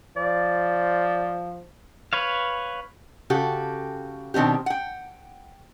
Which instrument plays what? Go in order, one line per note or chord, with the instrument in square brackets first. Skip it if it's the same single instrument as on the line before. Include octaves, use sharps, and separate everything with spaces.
[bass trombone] F3 [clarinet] D5
[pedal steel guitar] B4 C#5 F5
[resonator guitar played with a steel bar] C#3 F#4 G4 A4
B2 D#3 C4 D4 G4
F#5 G5